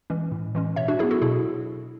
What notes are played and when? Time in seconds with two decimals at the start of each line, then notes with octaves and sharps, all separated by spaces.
0.10 E3 G#3 C#4
0.32 A2
0.55 E3 G#3 C#4
0.76 B2 C#5 E5
0.88 D4 F#4
0.99 F#3 B3 E4 G#4
1.11 F#4 A4
1.22 B2 E4 G#4